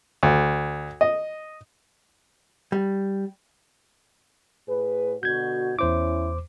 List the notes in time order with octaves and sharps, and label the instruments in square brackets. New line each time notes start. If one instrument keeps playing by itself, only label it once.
[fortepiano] D2
D#5
[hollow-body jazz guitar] G3
[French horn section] A2 G#4 B4
[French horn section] B2 D3 F#4 [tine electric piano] G6 G#6
[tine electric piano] E2 C5 D6 [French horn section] C#4 E4